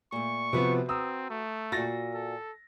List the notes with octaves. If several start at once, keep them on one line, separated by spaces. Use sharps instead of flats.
A#2 A3 C#6
C3 F3 B3 F#4 B4
C4 A#5 D#6 E6
A3
A#2 F4 F#4 A6 A#6
A4